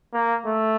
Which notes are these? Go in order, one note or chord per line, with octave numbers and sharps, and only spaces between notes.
A#3
A3